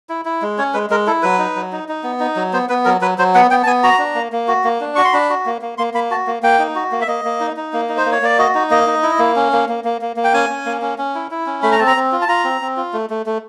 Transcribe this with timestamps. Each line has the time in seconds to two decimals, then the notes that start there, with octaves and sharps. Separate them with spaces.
0.09 E4
0.25 E4
0.42 G#3
0.58 C#4 C#5
0.74 G#3 B4
0.90 G#3 A#4
1.07 E4 A4
1.23 F#3 B4
1.39 D#4
1.56 F#3
1.72 D#4
1.89 D#4
2.04 B3
2.20 D#4
2.36 F#3
2.53 B3 C5
2.69 B3 B4
2.85 F#3 A#4
3.01 F#3 B4
3.18 F#3 C5
3.35 B3 F#5
3.50 B3 G5
3.63 A5
3.66 B3 G#5
3.83 F#4 A#5
3.99 D4
4.15 A#3
4.32 A#3
4.48 F#4
4.64 A#3
4.81 D4
4.96 F#4 C#6
5.05 C6
5.13 D4 B5
5.30 F#4
5.46 A#3
5.61 A#3
5.78 A#3 C6
5.94 A#3 B5
6.11 F#4 A5
6.27 A#3
6.43 A#3 G5
6.59 D#4
6.75 F#4
6.92 A#3
7.01 E5
7.08 A#3 D#5
7.25 A#3
7.40 D#4
7.56 D#4
7.73 A#3
7.89 D#4
7.97 C5
8.06 A#3
8.12 C#5
8.22 A#3 D5
8.38 F#4 D#5
8.55 D#4
8.70 A#3 D#5
8.87 D#4
9.03 E4
9.19 A#3
9.36 C#4
9.52 A#3
9.69 A#3
9.84 A#3
10.01 A#3
10.16 A#3
10.24 G5
10.34 C#4 G#5
10.50 C#4
10.66 A#3
10.82 C#4
10.98 C#4
11.15 E4
11.31 E4
11.46 C#4
11.63 A3 B5
11.72 A#5
11.79 C4 A5
11.87 A#5
11.96 C4
12.12 F4
12.22 A5
12.29 F4 A#5
12.44 C4
12.61 C4
12.77 F4
12.93 A3
13.10 A3
13.26 A3